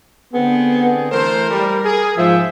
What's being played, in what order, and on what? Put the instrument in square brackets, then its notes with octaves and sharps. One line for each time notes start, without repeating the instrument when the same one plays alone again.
[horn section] D3 C4 G#4 [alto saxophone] B3
[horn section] E3 A3 C5 [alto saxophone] A#4
[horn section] G3
G#4
[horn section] G#2 E5 [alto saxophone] F3